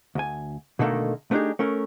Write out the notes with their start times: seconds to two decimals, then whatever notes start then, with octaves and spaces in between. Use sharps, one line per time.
0.15 D2 G#5
0.79 B2 D3 D#3 A3 A#3
1.31 A3 B3 D4 D#4 G4 G#4
1.59 A3 C#4 A#4